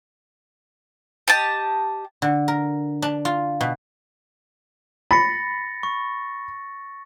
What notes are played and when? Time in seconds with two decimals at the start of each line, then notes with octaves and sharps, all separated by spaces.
1.28 G4 D#5 A5
2.22 D3
2.48 A#4
3.02 D4
3.25 F4
3.61 B2
5.11 B5 A6 A#6 C#7
5.83 C#6